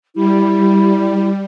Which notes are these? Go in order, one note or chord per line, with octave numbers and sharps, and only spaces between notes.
G3 E4